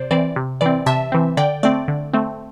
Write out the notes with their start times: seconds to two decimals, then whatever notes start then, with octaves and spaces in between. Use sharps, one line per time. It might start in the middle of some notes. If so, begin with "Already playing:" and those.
Already playing: C3 C5 D5
0.11 E3 C4 D5
0.36 C3
0.61 E3 C4 D5
0.86 C3 E5 A5
1.12 E3 C4
1.37 D3 D5 G5
1.63 A3 C4 D5
1.88 D3
2.13 A3 C4